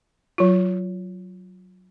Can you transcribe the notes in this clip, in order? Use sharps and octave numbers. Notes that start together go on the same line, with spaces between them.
F#3 F4